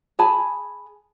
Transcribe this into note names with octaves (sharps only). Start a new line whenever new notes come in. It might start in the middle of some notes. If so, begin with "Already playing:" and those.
G#4 G#5 A5 B5